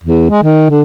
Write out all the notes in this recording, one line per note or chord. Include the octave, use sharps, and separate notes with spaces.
E2
G#3
D#3
D3